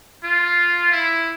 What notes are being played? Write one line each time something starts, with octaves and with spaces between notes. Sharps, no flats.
F4
E4